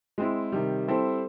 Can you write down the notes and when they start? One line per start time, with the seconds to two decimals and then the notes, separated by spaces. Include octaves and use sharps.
0.18 G#3 C4 E4
0.52 C3 D#3 G3
0.88 G3 C4 E4 A4 C5